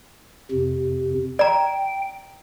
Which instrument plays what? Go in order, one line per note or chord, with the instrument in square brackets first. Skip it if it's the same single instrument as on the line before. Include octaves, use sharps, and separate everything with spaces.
[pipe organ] F2 C3
[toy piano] D5 A#5 [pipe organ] G5